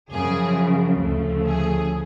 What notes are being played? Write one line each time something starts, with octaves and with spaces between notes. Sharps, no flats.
F#2 C#3 F3 G#4
D2 C#3 F3 A3
G#4